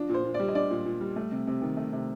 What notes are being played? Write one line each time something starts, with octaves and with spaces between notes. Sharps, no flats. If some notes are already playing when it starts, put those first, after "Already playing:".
Already playing: F3 D4
A#2 C5
A#2
D5
G3
D#5
D4 D5
A#2
A#2
G3
A3
C3
C3
D#3
A3
C3